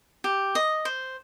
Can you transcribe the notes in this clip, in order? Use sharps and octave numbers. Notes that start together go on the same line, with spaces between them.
G4
D#5
C5